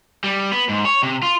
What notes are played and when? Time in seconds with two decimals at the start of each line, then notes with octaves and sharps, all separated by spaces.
0.24 G3
0.52 B3
0.69 G#2
0.85 C#5
1.03 C3
1.23 F4